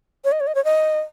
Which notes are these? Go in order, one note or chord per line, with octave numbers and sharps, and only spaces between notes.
C#5
D#5
C#5
D#5
C#5
D#5